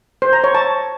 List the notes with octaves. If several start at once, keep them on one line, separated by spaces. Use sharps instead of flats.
C5
A#5
C#5
A5